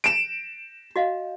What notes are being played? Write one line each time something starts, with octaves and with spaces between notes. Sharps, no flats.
D7 E7
F#4 D#5 F5